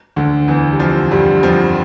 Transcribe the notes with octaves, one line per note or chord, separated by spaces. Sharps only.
D2 D3
E2 E3
G3
F2 F3
G2 G3
F2 F3